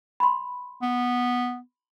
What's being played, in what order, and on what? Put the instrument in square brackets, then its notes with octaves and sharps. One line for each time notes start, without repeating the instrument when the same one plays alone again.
[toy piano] B5 C6
[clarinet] B3